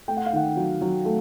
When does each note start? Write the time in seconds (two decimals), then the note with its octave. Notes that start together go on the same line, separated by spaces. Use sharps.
0.08 A3 G5
0.17 F#5
0.26 F5
0.33 D#3 F#5
0.56 F#3
0.81 F#3
1.05 A3